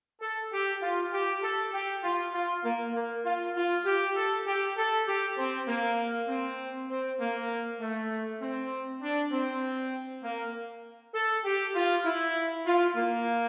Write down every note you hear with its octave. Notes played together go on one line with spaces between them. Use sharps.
A4
G4
F4
G4
A4
G4
F4
F4
A#3
A#3
F4
F4
G4
A4
G4
A4
G4
C4
A#3
C4
C4
A#3
A3
C4
D4
C4
A#3
A4
G4
F4
E4
F4
A#3